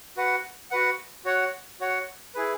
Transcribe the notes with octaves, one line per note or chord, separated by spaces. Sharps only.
F#4 B4 F#5
F#4 B4 F#5
F#4 C#5 F#5
F#4 C#5 F#5
E4 G#4 B4